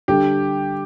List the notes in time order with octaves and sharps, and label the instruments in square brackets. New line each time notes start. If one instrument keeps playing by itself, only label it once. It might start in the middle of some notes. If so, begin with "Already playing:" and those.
[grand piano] D3 G3 D4 A4 [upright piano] G4